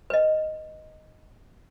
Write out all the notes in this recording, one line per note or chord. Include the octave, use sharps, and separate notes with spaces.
B4 D#5